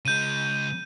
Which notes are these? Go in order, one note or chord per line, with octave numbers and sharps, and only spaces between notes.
C#3 G#3 G6 D#7